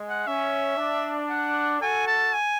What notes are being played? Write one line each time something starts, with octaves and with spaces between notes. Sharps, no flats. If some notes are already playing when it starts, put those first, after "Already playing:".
Already playing: G#3
F#5
C#4 E5
D4
F#5
F#4 A4 G#5
A5
G#5